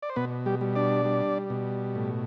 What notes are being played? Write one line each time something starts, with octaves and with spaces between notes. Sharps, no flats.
D5
C5
B2 B3 B4
G3 G4
G3
D4 D5
G3
B2
A2